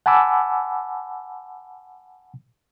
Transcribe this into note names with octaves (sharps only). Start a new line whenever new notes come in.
F#5 G#5 A5 B5 D6 E6